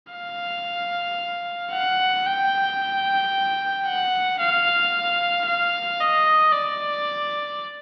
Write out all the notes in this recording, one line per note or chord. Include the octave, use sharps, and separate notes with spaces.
F5
F#5
G5
F#5
F5
F5
D#5
D5